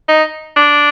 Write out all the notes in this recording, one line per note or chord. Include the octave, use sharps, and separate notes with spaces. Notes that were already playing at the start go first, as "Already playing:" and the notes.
D#4
D4